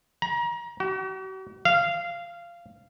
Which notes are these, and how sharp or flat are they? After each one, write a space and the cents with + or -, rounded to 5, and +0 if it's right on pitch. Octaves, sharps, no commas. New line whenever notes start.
A#5 +30
F#4 +45
F5 -15